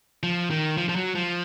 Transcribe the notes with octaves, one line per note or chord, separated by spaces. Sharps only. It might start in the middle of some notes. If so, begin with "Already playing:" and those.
F3
D#3
F3
F3
F#3
F3